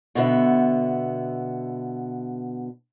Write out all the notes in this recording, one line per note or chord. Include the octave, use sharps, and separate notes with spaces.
B2 D3 B3 E5